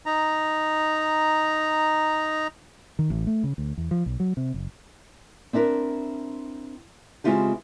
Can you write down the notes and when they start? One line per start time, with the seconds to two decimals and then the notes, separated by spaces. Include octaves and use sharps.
0.06 D#4 A#5
2.99 D#3
3.10 A1
3.27 A3
3.44 C#3
3.58 D2
3.77 E2
3.91 F3
4.06 B1
4.20 F#3
4.37 C3
4.54 F#1
5.53 C4 D4 E4 A#4
7.24 C#3 G#3 C4 E4 F4 G4